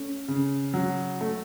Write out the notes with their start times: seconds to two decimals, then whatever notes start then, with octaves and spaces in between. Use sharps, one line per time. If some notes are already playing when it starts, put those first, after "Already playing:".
Already playing: A3 C#4
0.28 C#3
0.74 F#3
1.21 A3